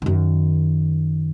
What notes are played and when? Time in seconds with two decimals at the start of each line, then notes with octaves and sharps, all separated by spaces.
0.02 F#2 D#3